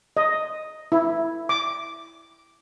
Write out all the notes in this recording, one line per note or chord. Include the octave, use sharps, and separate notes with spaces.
D#5
E4
D6